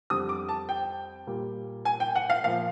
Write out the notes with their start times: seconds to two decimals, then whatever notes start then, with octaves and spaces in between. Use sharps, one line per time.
0.10 F2 D3 G3 D#6
0.29 D6
0.49 A5
0.69 G5
1.27 A#2 G3
1.85 G#5
2.00 G5
2.15 F#5
2.30 F5
2.44 A#2 F3 F5